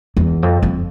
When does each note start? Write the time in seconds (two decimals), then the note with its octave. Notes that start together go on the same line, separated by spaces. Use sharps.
0.17 E2
0.43 F2
0.63 F2